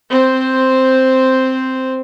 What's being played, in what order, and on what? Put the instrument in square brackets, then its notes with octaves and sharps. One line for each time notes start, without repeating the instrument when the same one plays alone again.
[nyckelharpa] C4 C5